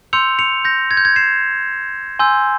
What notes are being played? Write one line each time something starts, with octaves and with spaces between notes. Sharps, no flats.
C6 E6 G6 C#7 F7
C#7 F7
G6 A#6
G#6
G6
G#6
C7 E7
G#5 C6 E6 G6